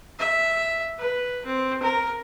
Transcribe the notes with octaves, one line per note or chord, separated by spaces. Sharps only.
E5
B4
C4
A#4